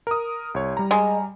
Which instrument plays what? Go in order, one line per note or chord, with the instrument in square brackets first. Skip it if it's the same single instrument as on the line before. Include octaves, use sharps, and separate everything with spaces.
[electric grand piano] A#4 D#6
C2 C#5
G3 A#5
[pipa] G#3